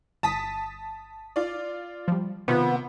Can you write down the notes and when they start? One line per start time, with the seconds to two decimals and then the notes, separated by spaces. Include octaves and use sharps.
0.23 G1 A5 D#6 B6
1.36 F4 D5
2.08 F3 G3
2.48 C3 D#3 B3 F4 B4